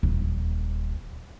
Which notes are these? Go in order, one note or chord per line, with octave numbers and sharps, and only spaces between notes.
D#1